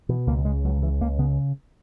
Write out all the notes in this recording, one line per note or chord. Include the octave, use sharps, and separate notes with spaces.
B2 E3
C#2 A#3
C#3 G#3
C#2 F#3
C#3 E3
C#2 A#3
C#3 B3